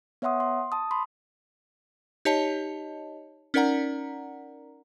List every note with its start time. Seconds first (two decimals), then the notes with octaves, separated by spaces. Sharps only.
0.22 B3 C#5 E5 F#5 C6 D#6
0.40 C6
0.72 A5 D#6
0.91 B5 C6
2.25 D#4 G4 C#5 D#5 A5
3.54 C#4 D#4 A#4 D5 F#5 A#5